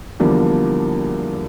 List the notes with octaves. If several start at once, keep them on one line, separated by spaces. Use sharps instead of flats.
E2 D3 F3 G3 A#3 D4